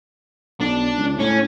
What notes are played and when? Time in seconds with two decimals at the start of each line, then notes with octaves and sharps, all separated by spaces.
0.60 B1 D4
0.98 C#2
1.19 A2 C#4